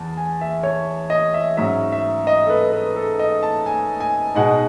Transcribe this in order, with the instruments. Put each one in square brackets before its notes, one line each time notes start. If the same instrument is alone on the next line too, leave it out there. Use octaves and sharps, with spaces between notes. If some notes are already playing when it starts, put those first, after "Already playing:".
Already playing: [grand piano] E2 A5
G#5
E5
C#5
D#5
E5
G#2 F#3 C#4 E5
E5
D#5
A4
B4
B4
A4
D#5
A5
G#5
G#5
B2 G#3 D#4 F#5